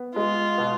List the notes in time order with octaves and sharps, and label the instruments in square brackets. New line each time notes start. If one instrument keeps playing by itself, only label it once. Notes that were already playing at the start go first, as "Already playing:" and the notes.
Already playing: [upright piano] B3
[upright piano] G#3 [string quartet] F4
[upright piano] B2